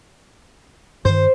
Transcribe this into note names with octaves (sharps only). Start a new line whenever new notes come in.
G2 D#3 C5